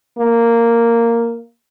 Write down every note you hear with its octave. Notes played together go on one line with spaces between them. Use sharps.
A#3